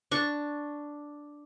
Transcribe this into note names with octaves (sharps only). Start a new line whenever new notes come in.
D4 C#6